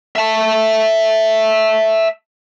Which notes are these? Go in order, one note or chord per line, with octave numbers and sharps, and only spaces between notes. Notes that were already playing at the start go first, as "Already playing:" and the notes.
E5 A5